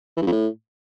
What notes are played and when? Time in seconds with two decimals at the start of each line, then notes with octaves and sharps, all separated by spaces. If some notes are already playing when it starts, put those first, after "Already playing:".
0.17 E3
0.22 G2
0.27 F2
0.32 A2